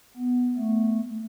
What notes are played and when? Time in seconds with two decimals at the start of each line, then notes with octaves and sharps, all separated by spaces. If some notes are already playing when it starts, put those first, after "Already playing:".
0.17 B3
0.57 A3